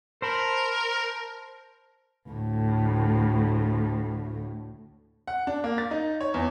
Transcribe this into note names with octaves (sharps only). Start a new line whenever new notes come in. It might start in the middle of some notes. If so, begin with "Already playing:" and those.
A#4 C5 A5 B5
D2 A2
F#5
D4
A#3
A6
D#4
C#5
E2